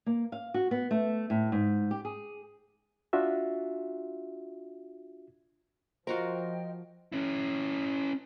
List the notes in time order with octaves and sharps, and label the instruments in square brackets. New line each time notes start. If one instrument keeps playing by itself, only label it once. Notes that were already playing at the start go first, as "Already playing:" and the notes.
[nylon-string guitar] A#3
F5
F#4
B3
A3
A2
G#2
G4
G#4
[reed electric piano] D4 F4 F#4 E5
[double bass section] F3 [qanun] F4 F#4 A#4 [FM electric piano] C5 [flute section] D#5 G5
[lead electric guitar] C#4 E4